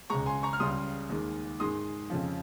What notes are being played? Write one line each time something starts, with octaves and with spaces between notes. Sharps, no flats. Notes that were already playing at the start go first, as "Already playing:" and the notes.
C#2 C#3 G#3 A#5 C#6
G#5 C6
A#5 C#6
F6
C#2 C#3 G3 C6 D#6
D#2 D#3 G#3
G#2 D#3 G#3 C6 D#6
F2 C#3 F3